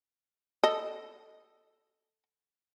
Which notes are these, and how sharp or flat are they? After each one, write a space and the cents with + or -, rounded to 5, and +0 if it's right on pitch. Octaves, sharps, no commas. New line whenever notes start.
A4 +0 D#5 +0